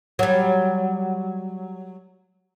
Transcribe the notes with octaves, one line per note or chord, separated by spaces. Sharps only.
F#3 G3